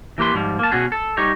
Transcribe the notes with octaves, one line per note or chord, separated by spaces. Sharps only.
E3 A#3 G4 B4 C6
G#2 F3 G3
A#3 A5
B2 C#4 F#4 G#4
A4
G3 D#4 G4 C#5